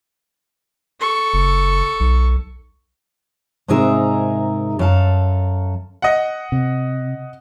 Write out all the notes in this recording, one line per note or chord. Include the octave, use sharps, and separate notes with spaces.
A4 C#6
F#1
B1
G#2 C3 D#4 G#4 A#4 E5
F#2 A4 F5 A5
D#5 F#5
C3